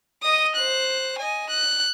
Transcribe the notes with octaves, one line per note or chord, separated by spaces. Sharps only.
D#5 D#6
C5 F#6
D#5 G#5
F#6